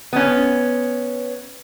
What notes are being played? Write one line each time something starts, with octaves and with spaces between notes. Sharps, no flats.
B3 C#4